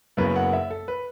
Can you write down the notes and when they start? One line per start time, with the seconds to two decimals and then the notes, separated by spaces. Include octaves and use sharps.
0.17 F#1 F#2 C#3 F#3 B3 B4
0.36 F#5
0.53 E5
0.71 A4
0.88 B4